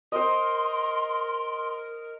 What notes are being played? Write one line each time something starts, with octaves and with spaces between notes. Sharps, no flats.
A#4 C5 D#5 C6